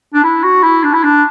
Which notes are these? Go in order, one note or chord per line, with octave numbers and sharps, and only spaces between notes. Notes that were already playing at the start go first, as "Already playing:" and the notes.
D4
E4
F#4
E4
D4
E4
D4